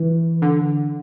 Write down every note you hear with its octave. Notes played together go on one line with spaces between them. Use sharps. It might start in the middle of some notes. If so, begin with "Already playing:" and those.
Already playing: E3
D3